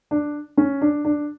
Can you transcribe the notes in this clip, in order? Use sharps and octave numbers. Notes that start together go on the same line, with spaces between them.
D4
C#4
D4
D4